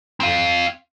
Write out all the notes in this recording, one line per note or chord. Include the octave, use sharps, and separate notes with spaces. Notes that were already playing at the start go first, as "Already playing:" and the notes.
C4 F5